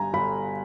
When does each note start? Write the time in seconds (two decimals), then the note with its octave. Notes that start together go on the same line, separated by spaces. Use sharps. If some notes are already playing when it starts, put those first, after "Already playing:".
Already playing: G1 G2 G#5 A#5
0.14 G1 B5